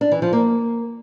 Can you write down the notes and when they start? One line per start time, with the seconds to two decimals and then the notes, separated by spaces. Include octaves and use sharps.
0.01 D4
0.12 E3
0.22 F3
0.33 A#3